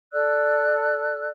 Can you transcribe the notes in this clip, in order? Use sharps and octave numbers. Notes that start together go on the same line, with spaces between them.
A4 D5 E6 F#6